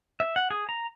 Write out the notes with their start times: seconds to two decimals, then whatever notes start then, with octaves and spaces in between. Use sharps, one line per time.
0.20 E5
0.36 F#5
0.50 G#4
0.69 A#5